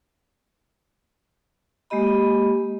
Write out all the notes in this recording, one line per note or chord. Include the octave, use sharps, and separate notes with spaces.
G#3 A#3 G4 D#5 B5